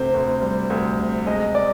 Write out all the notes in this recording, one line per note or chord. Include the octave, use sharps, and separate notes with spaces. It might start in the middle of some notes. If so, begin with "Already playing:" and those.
Already playing: D2 C3 C5
D2
G3
D2
C3
G#3 D#5
D5